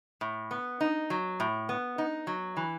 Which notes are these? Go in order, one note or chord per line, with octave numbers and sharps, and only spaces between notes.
A2
B3
D#4
F#3
A2
B3
D#4
F#3
E3